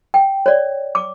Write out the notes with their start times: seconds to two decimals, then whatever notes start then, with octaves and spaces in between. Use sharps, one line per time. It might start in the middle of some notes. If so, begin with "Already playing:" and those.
0.14 G5
0.46 C#5 D5
0.95 D6